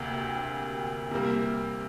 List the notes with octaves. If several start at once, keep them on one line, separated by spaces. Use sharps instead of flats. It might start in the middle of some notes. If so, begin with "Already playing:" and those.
Already playing: D2 C3 A#3 G4
C3 G3 A#3